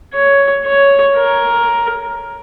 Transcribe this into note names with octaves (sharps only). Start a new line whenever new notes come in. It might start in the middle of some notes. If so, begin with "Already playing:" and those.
C#5
C#5
A#4